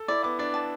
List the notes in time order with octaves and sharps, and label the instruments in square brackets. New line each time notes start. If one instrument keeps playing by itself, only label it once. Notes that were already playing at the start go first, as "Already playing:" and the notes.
Already playing: [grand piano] A4
[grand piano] E4 [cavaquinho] D5
[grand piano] B3 [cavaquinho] D6
[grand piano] D4 [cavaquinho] D5
[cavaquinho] A5